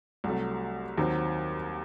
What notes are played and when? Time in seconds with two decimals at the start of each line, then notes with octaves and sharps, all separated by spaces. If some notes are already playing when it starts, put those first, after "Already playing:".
0.24 C2 C3 F#3 A3
0.98 D#2 D#3 F#3 C4